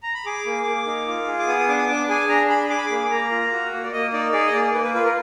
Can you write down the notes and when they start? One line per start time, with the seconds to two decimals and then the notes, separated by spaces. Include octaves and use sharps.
0.03 A#5
0.14 B5
0.26 G#4 D6
0.46 A#3
0.66 A#3
0.86 D#4
1.07 F4
1.27 G#4
1.39 D6
1.47 B3 D#6
1.58 D#6
1.69 D4 D6
1.78 D#6
1.88 D4 D6
2.09 G#4 G#5
2.29 D4 A#5
2.49 G#4 B5
2.69 G#4 D6
2.78 B5
2.86 A#3 D6
3.11 A#3 A#5
3.31 F4
3.52 F#4
3.73 A#3
3.83 D5
3.93 A#3 D#5
4.13 D#4 D5
4.33 G#4 D5
4.46 D#5
4.53 A#3 D5
4.74 A#3 B4
4.84 B4
4.95 F4 B4
5.04 A#4